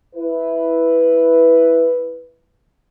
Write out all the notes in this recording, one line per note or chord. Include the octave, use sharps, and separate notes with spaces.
E4 B4